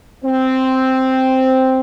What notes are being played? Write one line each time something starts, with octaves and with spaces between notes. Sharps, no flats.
C4